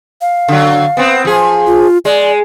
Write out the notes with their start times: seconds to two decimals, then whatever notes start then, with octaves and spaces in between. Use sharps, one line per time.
0.21 F5
0.48 D3 F#3
0.97 B3 C4
1.25 F3 G#4
1.67 F4
2.05 G#3 D5